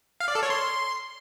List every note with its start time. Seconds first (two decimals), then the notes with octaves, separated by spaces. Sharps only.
0.20 F5
0.28 D5
0.35 A4
0.43 C#5
0.50 C6